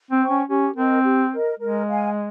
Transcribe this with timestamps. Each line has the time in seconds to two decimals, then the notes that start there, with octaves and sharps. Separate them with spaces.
0.11 C4
0.20 C5 G5 C#6
0.30 C#4
0.48 C#4 G4
0.76 C4 A#4 D#5
1.04 G4
1.32 A#4 D#5
1.60 G#3 A#4
1.88 F5 G#5